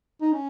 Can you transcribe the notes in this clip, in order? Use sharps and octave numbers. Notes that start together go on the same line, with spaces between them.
D#4
C#4